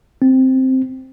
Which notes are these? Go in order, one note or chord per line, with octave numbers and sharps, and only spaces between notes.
C4